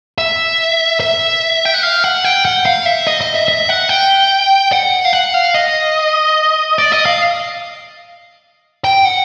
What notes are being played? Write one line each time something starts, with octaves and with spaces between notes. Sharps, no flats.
E5
E5
G5
F#5
F5
F#5
G5
F#5
F5
E5
D#5
D#5
E5
E5
F#5
G5
F#5
F5
F#5
F5
D#5
D5
D#5
F5
G5
F#5